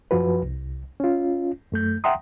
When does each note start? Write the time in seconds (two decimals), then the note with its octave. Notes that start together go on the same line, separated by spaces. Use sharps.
0.11 F#2 F3 F#4 B4
0.43 C2
1.00 C#4 F4
1.72 F#2 A3 G6
2.04 E5 F#5 G5 A#5 C6 D#6